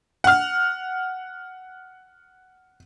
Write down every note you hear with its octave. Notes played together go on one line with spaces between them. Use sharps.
F#5 F6